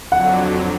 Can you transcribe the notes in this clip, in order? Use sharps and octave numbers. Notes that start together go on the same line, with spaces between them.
F2 D3 F#3 F#5